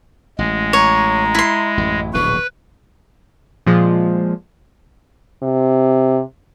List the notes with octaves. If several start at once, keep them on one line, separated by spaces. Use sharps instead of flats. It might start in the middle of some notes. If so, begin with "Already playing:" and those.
A1 G#3
C#5 A#5
E4 C6
A1 F#2
D1 A#1 B2 B4 C#6
A#2 F3 G#3
C3